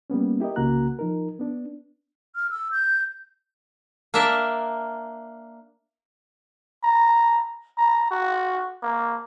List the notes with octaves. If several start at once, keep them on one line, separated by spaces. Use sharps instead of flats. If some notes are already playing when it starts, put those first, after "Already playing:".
G3 A#3 B3 C#4
E4 G4 A#4 D#5
C2 C#3 A#3 F#4 A#5 F#6
F3 D#4 A#4
B3 D4
F6
E6
G6
A#3 D4 A#4 E5 A5
A#5
A#5
F#4
A#3